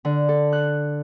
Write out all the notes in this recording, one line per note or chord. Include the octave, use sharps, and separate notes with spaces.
D3
A4
F#6